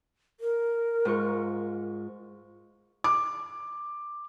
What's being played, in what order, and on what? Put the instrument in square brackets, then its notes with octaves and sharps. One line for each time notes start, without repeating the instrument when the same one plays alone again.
[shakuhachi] A#4
[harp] G#2 F4 C#6
[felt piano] D6